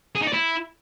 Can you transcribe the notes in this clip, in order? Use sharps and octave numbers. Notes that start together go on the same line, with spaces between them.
G#4
D#4
D5
E4